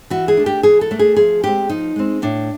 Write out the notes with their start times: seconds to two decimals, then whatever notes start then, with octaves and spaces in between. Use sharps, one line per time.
0.10 E3 F#4
0.28 G#4
0.37 A3 D4
0.46 G4
0.63 E3 G#4
0.81 A4
0.91 A3 D4
0.99 G#4
1.16 F3 G#4
1.43 G#3 C4 G4
1.70 F3 D#4
1.96 G#3 C4
2.22 A2 D4